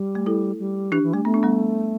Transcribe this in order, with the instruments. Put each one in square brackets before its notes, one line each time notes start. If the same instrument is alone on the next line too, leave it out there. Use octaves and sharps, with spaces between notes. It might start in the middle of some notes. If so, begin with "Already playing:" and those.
Already playing: [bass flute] G3
[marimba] A3
E4 A4
[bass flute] G3
[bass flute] E3 [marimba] D4 G4
[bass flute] E3
[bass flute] G3 [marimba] A3
[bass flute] A3 [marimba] B3
[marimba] D4
G3 B3